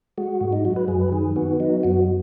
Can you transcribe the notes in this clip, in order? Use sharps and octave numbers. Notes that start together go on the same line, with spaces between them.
G#3 F#4
G#2
D#4
F#3 F#4
B4
F#2 G#4
B4
D#3 G#4
B3 F#4
F#3 D#4
F#2 F#4